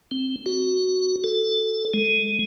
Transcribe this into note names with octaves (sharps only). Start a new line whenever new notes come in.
C4
F#4
A4
G#3